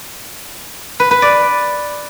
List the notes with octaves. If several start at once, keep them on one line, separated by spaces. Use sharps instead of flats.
B4
B4
D5